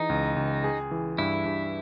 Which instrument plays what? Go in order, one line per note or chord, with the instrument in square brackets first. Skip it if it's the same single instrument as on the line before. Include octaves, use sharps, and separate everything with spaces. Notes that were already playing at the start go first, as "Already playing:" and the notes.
Already playing: [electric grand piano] E3 G#4 [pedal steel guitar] D#4
[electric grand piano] C#2
C#2
G#4
E3
[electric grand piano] G2 [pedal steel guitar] E4
[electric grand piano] G2